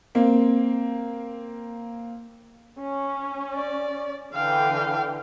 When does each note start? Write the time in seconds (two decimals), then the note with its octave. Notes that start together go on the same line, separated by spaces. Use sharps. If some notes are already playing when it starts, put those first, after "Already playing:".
0.15 A#3 C4
2.80 C#4
3.55 D5
4.34 D3 E3 F5 G5